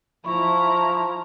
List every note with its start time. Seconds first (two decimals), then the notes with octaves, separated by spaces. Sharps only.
0.24 F3 E4 A#5 B5 C#6